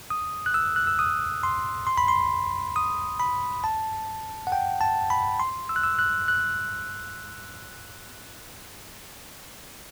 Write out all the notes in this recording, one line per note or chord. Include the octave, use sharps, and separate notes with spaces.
D#6
F#6
E6
F#6
E6
D#6
C6
C6
B5
C6
D#6
B5
A5
F#5
G5
A5
B5
C6
E6
F#6
E6
F#6
F#6